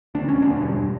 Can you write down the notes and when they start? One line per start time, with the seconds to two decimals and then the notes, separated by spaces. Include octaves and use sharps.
0.15 D2 D4
0.29 C#4
0.39 E1 D4
0.61 G2